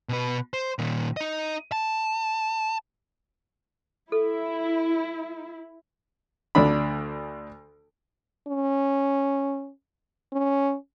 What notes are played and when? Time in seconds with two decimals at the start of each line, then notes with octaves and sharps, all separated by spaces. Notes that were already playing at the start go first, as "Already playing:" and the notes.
0.09 B2 B4
0.53 C5
0.78 A#2 D#3
1.17 D#4 D#5
1.72 A5
4.12 E4 A4
6.55 D2 D4 B5
8.48 C#4
10.33 C#4